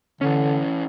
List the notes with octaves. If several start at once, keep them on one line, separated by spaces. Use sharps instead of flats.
D3 E3 C#4